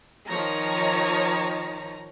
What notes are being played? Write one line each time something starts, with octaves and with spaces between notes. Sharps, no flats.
D#3 F3 C#5 A#5